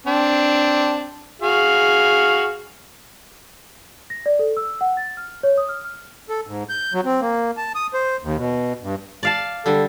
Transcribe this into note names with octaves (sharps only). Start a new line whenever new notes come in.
C4 D4
F#4 G#4 F5
A#6
D5
A4
E6
F#5
A6
F6
C#5
D#6
F6
F6
A4
G#2
G6
F#3
C4
A#3
A5
D#6
C5
D#2
B2
G2
D5 F5 A5
D3 G3 A4